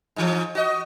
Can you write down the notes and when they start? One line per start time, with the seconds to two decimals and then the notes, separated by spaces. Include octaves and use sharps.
0.16 G#2 E3 F3
0.55 F#4 D#5